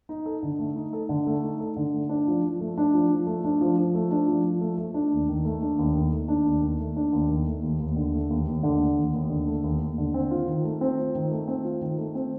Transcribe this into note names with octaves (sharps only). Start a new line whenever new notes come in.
D#4
A4
D3
A3
D#4
A4
D3
A3
D#4
A4
D3
A3
D4
F3
F3
A3
D4
F3
F3
A3
D4
F3
F3
A3
D4
F3
F3
A3
A3
D4
D#2
D#3
A3
D4
D#2
D#3
A3
D4
D#2
D#3
A3
D4
D#2
D#3
A3
D#2
D#2
D3
A3
D#2
D#2
D3
A3
D#2
D#2
D3
A3
D#2
D#2
D3
C4
F4
D#3
A3
C4
F4
D#3
A3
C4
F4
D#3
A3
C4